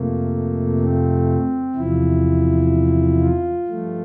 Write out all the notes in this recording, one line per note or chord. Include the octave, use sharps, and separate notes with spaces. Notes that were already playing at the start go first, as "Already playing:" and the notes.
Already playing: F2 C3 F3 A3 A#3
C4
E2 C3 F3 E4
F4
G2 F3 A3